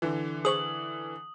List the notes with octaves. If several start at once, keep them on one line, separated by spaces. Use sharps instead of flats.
D3 E3
G#4 C5 C#6 D#6 F#7